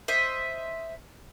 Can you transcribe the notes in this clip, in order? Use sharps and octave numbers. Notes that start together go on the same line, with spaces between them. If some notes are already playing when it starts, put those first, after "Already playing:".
C5 D#5 E5